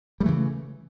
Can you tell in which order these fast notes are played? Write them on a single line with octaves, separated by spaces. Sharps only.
G3 A3 E3 C#3